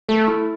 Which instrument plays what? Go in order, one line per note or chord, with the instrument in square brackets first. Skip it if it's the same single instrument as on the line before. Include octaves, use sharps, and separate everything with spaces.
[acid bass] A3 [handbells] A4
[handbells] E4